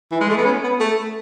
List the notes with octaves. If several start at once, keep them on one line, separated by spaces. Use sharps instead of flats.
E3
G#3
A3
B3
C#4
B3
A3